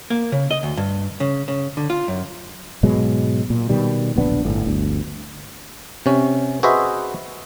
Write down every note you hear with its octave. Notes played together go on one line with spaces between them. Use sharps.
A#3
C#3
D#5
D2
G2
C#3
C#3
D3
F4
F#2
G#2 B2 F#3 G#3
A#2
B2 D#3 G3
D1 A#1 B3 D4
G1 A2
G1 D2
C3 C#4
F#4 G#4 B4 C5 D#5 E5